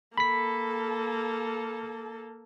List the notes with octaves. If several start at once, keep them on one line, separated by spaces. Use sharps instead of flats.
A#3 A4 B5 B6